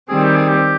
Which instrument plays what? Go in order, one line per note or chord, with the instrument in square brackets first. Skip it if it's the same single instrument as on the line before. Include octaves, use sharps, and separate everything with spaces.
[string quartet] D#3 G3 C4 [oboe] G#4
[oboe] G4
G#4
G4